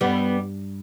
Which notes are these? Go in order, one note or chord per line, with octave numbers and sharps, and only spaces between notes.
G2 G3 B3